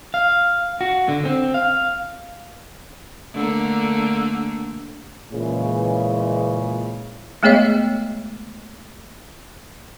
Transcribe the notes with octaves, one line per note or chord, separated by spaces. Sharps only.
F5
F#4
D3
C4
F5
D3 A3 A#3
A#2 C#3 E3 G#3
G#3 A3 B3 G#4 C#5 D#5